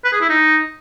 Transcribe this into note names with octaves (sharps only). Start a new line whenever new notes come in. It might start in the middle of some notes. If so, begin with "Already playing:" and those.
B4
G#4
E4
D#4